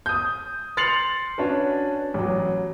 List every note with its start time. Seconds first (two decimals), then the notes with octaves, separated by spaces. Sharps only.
0.06 D#6 G6
0.77 C6 A6 C7 C#7 F7 F#7
1.38 C#4 D4 F#4 B4
2.14 A1 F#3